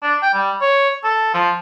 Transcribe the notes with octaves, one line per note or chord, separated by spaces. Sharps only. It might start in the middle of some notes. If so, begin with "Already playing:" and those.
D4
G5
G3
C#5
A4
F3